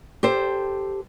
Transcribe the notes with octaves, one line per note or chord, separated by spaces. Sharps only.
G4 A4 C5